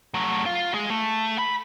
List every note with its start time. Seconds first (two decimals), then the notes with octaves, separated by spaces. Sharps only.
0.14 F#3 A3
0.46 F4
0.74 G#3 G#4
0.90 A3
1.39 B5